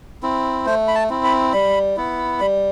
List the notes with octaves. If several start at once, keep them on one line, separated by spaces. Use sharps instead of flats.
C4 E4
A3 C5
B5
A5
C4 E4
B5
G3 B5
B3 E4
G3 B5